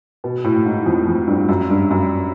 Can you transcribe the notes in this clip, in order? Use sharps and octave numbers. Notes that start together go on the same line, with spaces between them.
B2
A2
G#2
F2
F2
G2
F#2
G2
F#2